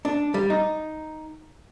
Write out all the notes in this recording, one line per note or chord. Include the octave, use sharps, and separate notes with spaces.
D4
G3
D#4